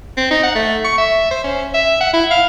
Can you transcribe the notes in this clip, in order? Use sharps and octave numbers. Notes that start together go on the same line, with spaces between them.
C4
D#4
F#5
A3
C#6
E5
C5
C#4
E5
F#5
E4
F5